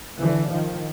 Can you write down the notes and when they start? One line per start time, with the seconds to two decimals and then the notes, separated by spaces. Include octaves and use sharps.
0.19 D3 E3
0.49 D#3 F3